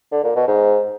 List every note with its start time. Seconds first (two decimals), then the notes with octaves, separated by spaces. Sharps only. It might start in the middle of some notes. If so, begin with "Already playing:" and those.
0.12 D3
0.24 A#2
0.36 B2
0.48 G#2